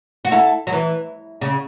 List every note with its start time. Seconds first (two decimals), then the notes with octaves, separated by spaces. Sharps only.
0.25 F#4
0.32 E4 A4
0.67 F#3
0.73 E3
1.41 C#3